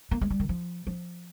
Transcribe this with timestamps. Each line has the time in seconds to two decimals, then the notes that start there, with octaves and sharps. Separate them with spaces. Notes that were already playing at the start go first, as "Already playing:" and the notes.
0.11 A#3
0.21 G#3
0.30 G3
0.40 D#3
0.49 F3
0.87 F3